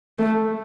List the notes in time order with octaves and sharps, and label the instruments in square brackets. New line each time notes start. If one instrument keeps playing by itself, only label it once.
[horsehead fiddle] A3